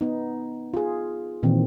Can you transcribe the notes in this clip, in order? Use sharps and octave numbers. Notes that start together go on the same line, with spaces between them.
B3 D#4
F4 G#4
A#2 D#3 E3 C4